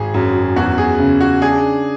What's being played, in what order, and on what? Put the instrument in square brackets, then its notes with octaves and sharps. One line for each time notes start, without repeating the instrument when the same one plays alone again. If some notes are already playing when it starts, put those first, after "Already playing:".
Already playing: [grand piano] G#1 [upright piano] G#4
[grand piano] F#2
[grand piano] E2 [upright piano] F#4
[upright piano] G#4
[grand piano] C#3
[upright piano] F#4
[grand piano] D4 [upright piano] G#4